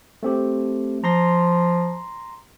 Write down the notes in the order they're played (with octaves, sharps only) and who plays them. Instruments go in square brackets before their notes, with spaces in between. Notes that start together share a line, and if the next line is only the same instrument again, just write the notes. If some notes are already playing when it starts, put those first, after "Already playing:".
[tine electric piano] A3 C4 G4
[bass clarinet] F3 [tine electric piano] A#5 C6 A#6